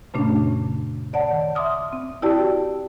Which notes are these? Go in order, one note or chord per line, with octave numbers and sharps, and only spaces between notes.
F#2 A#2 C#3 A3 C#4 D4
C#5 D5 F#5 A5
D#3
E5 C6 D6 D#6 F6
C4
E4 F#4 G4 D5 G5 A5